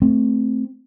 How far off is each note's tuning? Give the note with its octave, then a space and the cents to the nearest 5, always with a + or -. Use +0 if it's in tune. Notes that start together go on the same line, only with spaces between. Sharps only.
A3 +0 C4 +0